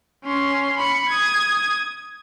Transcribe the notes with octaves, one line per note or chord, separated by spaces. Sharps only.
C#4 C6
B5 C#7
D#6 G#6